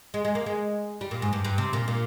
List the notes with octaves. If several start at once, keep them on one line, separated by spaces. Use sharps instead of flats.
G#3
G#3
A#3
G#3
G3
A#2
G#2
G2
G2
C3
A#2
A#2